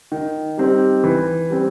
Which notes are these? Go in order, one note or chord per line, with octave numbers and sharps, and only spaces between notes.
D#3
G3 C4 D#4 G4
E3
G3 C4